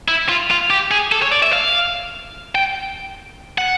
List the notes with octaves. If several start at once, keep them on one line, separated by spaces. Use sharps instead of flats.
E4
F4
F4
G4
G#4
A4
C#5
D5
E5
F5
G5
F#5